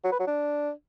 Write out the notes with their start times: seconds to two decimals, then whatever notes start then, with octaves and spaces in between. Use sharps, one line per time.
0.04 F#3
0.12 B4
0.19 F#3
0.27 D4